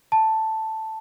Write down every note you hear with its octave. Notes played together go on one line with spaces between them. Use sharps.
A5